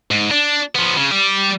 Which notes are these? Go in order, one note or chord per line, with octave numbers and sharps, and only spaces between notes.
G#2
D4
F3 B3
C#3
G3 G4